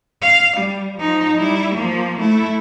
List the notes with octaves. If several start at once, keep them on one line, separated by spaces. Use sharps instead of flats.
F5
G3
F3 D#4
G3 E4
F3 A#3
A3 E4